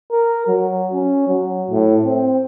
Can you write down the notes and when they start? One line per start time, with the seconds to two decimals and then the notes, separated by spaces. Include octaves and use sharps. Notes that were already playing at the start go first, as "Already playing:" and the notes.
0.11 A#4
0.48 F#3
0.93 C#4
1.28 F#3
1.70 A2
2.04 C4